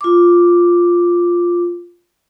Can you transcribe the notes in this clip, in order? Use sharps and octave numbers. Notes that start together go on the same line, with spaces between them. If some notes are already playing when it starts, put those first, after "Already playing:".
F4 D6